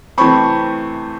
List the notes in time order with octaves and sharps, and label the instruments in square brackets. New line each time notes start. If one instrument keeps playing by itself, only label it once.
[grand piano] C3 E3 A3 C4 B5 C#6